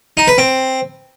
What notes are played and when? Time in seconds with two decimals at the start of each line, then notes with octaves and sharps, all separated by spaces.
0.17 D#4
0.28 B4
0.38 C4